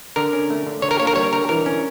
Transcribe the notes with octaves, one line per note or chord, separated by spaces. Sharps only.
D3 A#4
C#4
A3
D3
D3 C#5
A#4
A#3 C#5
A#4
G3 C#5
D3 A#4
E3 A#4
C#4